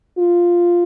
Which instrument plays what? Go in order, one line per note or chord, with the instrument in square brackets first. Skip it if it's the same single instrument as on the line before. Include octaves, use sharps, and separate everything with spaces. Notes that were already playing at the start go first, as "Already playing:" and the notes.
[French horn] F4